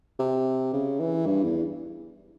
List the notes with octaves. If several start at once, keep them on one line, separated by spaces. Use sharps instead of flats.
C3
C#3
E3
G2
E2